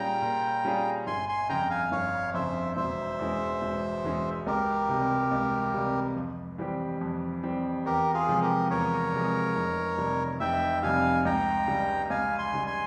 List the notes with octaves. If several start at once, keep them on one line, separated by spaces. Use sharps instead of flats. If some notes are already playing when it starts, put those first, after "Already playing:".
Already playing: A#2 G3 C#4 F4 G#4 G5 A#5
A#2
G3 C#4 F4 G#4
G1 G#5 C6
G#5 C6
F2 C#3 G5 A#5
F5 G#5
G1 C#5 F5
F2 C#3 C5 E5
E1 C5 E5
E2 E3 G#3 C#4
E1
E2 E3 G#3 C#4
C#2 G4 A#4
C3 G3
C#2
C3 G3
F2
E3 G3 C4 G4
F2
E3 G3 C4 G4
E2 G4 A#4
F4 G#4
C3 F3 G#3
G4 A#4
E2 A#4 C#5
C3 F3 G#3
F1
F2 C3 G3
F1 E5 G5
F2 C3 G3 F5 G#5
C#2 G5 A#5
C#3 G3
C#2 F5 G#5
G#5 C6
C#3 G3
G#5 C6